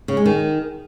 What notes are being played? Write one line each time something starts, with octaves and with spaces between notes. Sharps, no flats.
C#3
G#3
D#3